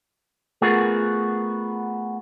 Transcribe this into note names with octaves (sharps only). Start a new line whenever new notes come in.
A3 B3 F4 F#4 G#4 A#4